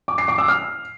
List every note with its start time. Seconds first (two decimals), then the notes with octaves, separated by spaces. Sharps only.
0.08 D6
0.18 C7
0.28 D6
0.38 E6
0.48 F6